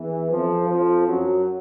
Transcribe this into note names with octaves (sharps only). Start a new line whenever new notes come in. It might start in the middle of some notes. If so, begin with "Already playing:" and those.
Already playing: E2 E3
F2 F3
F2 F3
F#2 F#3